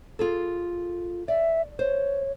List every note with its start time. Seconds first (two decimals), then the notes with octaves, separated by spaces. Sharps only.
0.19 F4 G#4 A4
1.28 D5 E5
1.79 C5 C#5